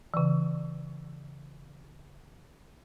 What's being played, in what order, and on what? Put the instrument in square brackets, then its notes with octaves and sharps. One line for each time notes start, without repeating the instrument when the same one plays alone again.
[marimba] C#3 E3